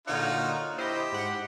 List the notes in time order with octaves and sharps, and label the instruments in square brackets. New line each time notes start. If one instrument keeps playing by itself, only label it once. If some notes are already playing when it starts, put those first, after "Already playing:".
[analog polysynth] A#2 D3 C#5 [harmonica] D#4 F4 F#4
[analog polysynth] E4 C5 D#5 [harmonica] G4
[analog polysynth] G#2 F#5